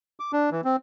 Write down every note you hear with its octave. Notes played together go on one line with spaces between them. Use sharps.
D6
D4
E3
C4